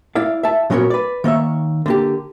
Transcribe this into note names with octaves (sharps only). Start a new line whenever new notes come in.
E4 D5 F5
E5 A5
A#2 F#3 B3 C#4 A#4 C#5
B4 D5
D#3 A#3 C#5 E5
D3 A#3 G4